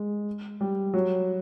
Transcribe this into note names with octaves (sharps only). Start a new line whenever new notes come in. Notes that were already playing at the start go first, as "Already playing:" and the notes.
Already playing: G#3
G3
F#3